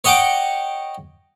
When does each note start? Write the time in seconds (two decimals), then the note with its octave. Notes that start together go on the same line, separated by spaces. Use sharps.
0.04 C#5 D#5 F#5 G5 D6